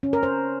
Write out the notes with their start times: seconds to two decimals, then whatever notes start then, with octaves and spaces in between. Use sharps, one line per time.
0.03 C#4
0.13 A#4
0.23 C5